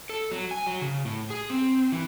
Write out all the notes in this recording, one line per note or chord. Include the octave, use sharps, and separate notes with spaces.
A4
F#3
G#5
F#3
C#3
A2
G#4
C4
E3